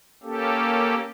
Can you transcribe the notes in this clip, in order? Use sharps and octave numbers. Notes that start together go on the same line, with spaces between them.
A#3 C#4 G4 A4